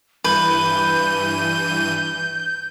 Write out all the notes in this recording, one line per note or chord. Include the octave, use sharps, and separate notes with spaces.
G2 E3 B4 G6 D#7